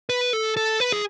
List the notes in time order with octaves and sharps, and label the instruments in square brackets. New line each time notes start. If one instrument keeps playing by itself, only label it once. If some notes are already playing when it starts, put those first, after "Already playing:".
[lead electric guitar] B4
A4
A4
B4
G#4